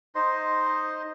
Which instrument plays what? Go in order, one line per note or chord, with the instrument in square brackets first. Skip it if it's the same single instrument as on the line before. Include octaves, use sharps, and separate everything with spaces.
[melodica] D#4 C5 D#5 C6